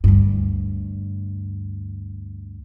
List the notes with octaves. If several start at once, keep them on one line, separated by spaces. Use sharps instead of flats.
D2 G2